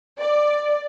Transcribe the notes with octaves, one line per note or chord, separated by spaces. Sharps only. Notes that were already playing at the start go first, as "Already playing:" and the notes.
D5